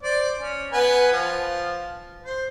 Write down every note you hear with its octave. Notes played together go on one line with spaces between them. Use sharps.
C5 D5
C#4
B3 B4 G#5
F3
C5